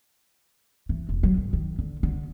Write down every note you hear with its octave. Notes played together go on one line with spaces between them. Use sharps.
E3
E1
F#3
G#1
D#3
D3
D3